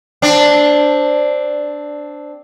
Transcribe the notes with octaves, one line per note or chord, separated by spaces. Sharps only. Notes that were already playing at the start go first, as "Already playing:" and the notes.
C4 D4